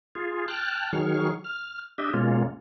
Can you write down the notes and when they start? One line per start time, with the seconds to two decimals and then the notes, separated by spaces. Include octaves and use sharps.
0.15 F4 G#4
0.48 G5 A5 F6 F#6
0.93 D#3 F#3 G#4 C#6 F6
1.44 F6
1.98 D4 G4 D#5 E5
2.13 B2 G#3 A#3 C#4 F4